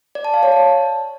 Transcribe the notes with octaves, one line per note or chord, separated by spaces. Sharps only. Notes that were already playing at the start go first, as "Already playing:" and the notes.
D5
A5
F5
C#5
A5